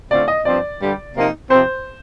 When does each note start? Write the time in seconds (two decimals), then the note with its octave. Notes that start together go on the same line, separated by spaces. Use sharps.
0.11 D3 A3 C4 F4 D5
0.28 D#5
0.45 G2 F3 C4 D5
0.81 G2 D3 G3
1.15 C3 F3 A#3 D#4
1.50 C3 F3 C4 C5